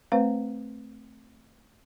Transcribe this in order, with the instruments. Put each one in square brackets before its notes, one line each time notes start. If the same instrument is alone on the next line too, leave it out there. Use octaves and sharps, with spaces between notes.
[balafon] A3 C4 B4 C5 F5